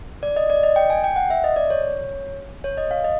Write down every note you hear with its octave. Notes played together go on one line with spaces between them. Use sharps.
D5
D#5
D5
D#5
G5
G#5
G5
F#5
E5
D#5
D5
C#5
C#5
D#5
F5
D#5